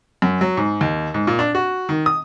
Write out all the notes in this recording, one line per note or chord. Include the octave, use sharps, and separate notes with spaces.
F#2
F#3
G#2
D#2
G#2
A#2
D4
F#4
D#3
D#6